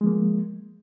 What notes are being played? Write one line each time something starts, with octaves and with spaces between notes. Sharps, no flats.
F3 G#3 A#3